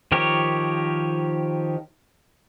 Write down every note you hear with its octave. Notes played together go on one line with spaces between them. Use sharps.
D#3 F3 G4 A#4 C#5